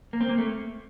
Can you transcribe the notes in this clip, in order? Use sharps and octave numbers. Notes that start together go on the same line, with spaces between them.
A#3
C4
A#3
A3